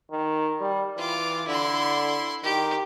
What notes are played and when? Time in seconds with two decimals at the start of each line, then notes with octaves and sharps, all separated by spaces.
0.11 D#3
0.60 G3
0.97 E3 F4 D6
1.47 D3 E4 C6
2.43 D#3 G4